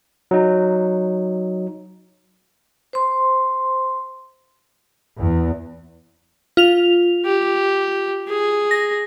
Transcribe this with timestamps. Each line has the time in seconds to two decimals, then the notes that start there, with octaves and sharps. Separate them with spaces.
0.31 F#3 D#4
2.93 C5 C6
5.18 E2
6.57 F4 F7
7.25 G4
8.29 G#4
8.71 A#6